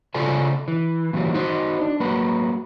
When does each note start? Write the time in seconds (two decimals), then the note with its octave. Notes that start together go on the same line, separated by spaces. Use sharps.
0.14 C#3 F4 A4 C5 D5 G#5
0.68 E3
1.13 A#2 D#3 E3 F#3 G3
1.34 D#4 F#4 C5
1.81 D4
2.00 F#3 A#3 B4